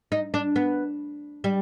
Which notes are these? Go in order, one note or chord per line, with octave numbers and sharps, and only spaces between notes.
D#4
D4
B3
G3